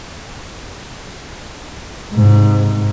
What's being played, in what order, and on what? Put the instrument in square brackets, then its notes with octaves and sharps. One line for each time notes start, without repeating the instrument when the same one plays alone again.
[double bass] G#2 C3